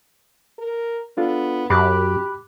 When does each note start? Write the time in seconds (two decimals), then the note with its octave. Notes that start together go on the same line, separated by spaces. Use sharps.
0.59 A#4
1.17 B3 D4 F4 A4
1.70 F#2 G4 B5 D6 F#6